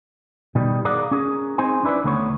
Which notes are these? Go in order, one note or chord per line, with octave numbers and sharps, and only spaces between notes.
B2 D#3 G3
G#4 A#4 D5 F5 F#5
C#4 G#4 A#4
C4 D#4 G#4 C5 G#5
C#4 D4 E4 B4 D5
D2 D#3 A3 B3 G#4 C#5